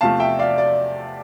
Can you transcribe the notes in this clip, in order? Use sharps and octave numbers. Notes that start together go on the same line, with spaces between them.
E2 C3 F3 A3 F5 A5
E5 G5
D5 F5
D5